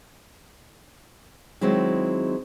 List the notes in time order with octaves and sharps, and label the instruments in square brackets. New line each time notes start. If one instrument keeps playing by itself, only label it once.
[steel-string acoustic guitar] D#3 F#3 G#3 C4 E4